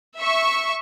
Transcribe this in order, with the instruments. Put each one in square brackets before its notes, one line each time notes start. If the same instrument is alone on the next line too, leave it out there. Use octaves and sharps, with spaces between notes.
[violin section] E5 C#6